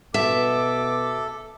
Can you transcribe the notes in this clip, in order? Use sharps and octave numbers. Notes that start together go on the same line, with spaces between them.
B2 A4 E5 D6